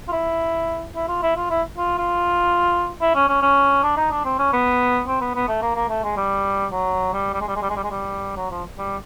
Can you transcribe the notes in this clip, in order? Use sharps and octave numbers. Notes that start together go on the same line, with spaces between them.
F4
E4
E4
F4
E4
F4
E4
F4
F4
E4
C#4
C#4
C#4
D4
D#4
D4
C4
C#4
B3
C4
B3
B3
A3
A#3
A#3
A3
G#3
G3
F#3
G3
G3
G#3
G3
G#3
G3
G#3
G3
G#3
G3
F#3
F3
G3